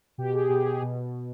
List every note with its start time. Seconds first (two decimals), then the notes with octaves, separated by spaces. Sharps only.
0.18 B2 G4
0.34 G#4
0.49 B2 G4
0.66 G#4
0.82 B2